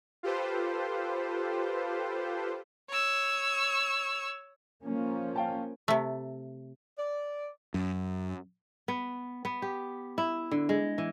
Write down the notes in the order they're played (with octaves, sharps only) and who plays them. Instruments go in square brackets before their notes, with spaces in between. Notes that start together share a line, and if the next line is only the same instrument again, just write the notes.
[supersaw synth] F4 G4 A4 B4 C5
[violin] C#5 E6
[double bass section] F3 A#3 C#4
[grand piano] F5 G5 A5
[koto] C3 A3
[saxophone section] D5
[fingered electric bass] F#2
[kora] B3
B3
G4
E4
D3
G#3
E3